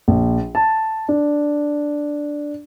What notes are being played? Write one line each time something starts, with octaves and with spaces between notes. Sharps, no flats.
A#1
A5
D4